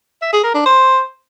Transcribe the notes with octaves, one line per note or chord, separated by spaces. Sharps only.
E5
G#4
A#4
D4
C5